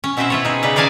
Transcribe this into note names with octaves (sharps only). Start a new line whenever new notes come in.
C#4
B2 C4 E4 B4 C5 E5
E4 F4 C#5
D#4 G#4
C#3 G3 B4
G#4 A#4 D5 F5 G#5 A5